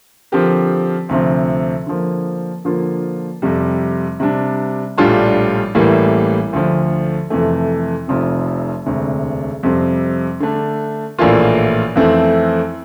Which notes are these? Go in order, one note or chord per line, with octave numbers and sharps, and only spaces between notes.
D3 F3 C4 G4 A#4
D2 C3 F3 C4
D3 F3 A#3
D3 F3 A#3 F4
F2 C3 G3
C3 G3 D4
A#1 A2 G3 D4 F4
A1 A2 E3 G3 A#3
D2 D3 F3
F2 C3 E3 A3
F1 F2 C3 F3 C4
E1 D2 C3
F2 C3 G3 C4
D3 A3 D4
A#1 A2 E3 A#3 F4
F2 E3 A3 C4 E4